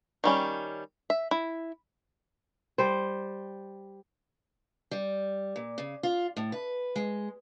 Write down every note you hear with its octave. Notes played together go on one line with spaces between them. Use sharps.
D#3 G3 C#4
E5
E4
G3 C5
G3
A#2
C#3
F4
A2
B4
G#3